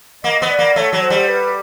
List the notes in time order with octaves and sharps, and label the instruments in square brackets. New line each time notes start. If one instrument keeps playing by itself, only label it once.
[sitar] A#3 [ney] D#5
[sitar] B3
[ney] D5
[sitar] A#3
[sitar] A3 [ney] C#5
[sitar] F#3
[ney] C5
[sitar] G3
[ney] B4